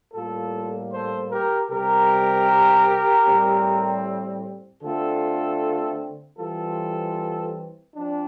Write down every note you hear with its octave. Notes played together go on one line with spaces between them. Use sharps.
A2 G3 A#3 F4 A4
A4 C5
G4 A#4
C3 G3 C4 G4 A#4
A2 G3 C4
D3 A3 C4 F4 A4
E3 G3 C4 F4 A4
F3 C4 D4